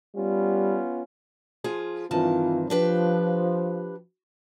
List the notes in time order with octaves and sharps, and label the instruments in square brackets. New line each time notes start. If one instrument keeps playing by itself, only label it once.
[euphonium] G3 [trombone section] B3 C#4 F4
[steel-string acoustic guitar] F3 F4 G#4
[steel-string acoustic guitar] G2 D#3 A5 [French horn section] E3 C4 F4
[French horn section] F3 [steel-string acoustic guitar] D4 G4 B4